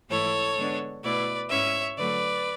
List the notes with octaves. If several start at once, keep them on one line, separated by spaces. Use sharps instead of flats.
G#2 E3 A3 E4 A4 C#5
D3 G#3 B3 D4
B2 A3 E4 B4 D5
G#2 G#3 C#4 E4 C#5 E5
D3 F#3 A3 B4 D5